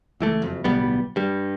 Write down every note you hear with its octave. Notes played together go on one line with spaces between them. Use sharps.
C#2 E3 A3
F#1 F2
D1 B1 G3 B3
G2 G3